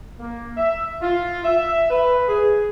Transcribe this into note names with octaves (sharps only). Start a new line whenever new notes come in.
A#3
E5
F4
E5
B4
G#4